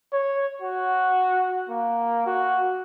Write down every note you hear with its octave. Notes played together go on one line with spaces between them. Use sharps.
C#5
F#4
A#3
F#4